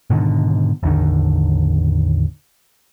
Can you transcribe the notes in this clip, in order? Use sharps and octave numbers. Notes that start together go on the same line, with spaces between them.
G#2 B2 D3 D#3
A1 E2 D3 D#3